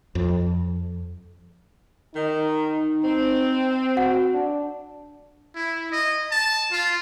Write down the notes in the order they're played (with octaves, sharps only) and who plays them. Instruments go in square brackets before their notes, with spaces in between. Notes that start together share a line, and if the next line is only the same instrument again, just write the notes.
[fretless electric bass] F2
[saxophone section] D#3 [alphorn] D#4
[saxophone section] C4
[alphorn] F#4 [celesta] F#5
[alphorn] D4
[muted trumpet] E4
D#5
A5
F4